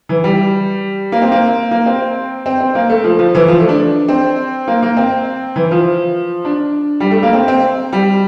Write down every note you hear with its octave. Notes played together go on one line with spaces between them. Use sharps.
E3
G3
A#3
C4
A#3
A#3
C4
C4
C4
A#3
A3
F3
F3
E3
F3
A3
D4
C4
A#3
A#3
C4
E3
F3
D4
G3
A3
A#3
C4
C4
G3